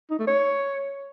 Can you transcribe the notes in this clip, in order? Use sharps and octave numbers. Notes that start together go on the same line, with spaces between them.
D#4
A3
C#5